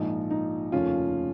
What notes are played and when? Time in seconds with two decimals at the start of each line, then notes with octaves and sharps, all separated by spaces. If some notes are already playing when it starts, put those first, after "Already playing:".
Already playing: A#1 G#2 F3 D#4
0.31 D#4
0.72 F1 D#2 C#3 F3 C#4 F4